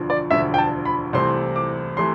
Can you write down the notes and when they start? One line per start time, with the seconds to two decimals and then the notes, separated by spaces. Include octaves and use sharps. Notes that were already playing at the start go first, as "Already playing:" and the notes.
Already playing: E1 D2 D3 F3
0.10 D5
0.30 E1 D2 D3 F3 E5
0.54 G5
0.58 A5
0.85 B5
1.13 C2 C3 E3 A3 C4 C6
1.56 D6
1.97 C3 E3 A3 C6